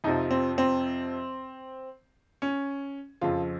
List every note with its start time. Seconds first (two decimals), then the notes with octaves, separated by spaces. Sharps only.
0.04 F2 C3 F3 D#4
0.31 C4
0.58 C4
2.42 C#4
3.21 F2 C#3 F3 F4